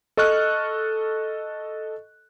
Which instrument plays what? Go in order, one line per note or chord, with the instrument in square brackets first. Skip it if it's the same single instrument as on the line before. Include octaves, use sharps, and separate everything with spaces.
[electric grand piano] A4 D#5 C#6 F6 F#6